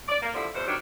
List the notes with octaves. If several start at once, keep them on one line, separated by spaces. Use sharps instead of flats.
D5
A#3
D3 F3 G3 E4
E2 B2 C5
D#3 F#3 G3 D4